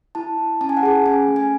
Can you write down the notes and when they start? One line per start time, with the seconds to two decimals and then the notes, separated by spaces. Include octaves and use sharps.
0.15 E4 A5
0.38 E4
0.61 C#4 A5
0.69 G#5
0.77 F#5
0.83 G#4 G#5
1.06 C#4 G#5
1.28 A3
1.36 G#5